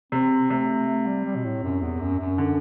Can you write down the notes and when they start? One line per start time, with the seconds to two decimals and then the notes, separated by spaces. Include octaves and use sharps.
0.12 C3 C4
0.50 C3 A3
0.87 A3
1.06 G3
1.26 G3
1.36 B2
1.44 A2
1.63 F#2
1.82 E2
2.01 F#2
2.19 F#2
2.38 D3